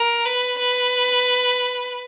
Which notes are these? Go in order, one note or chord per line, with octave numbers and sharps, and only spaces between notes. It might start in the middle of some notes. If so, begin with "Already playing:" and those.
Already playing: A#4
B4
B4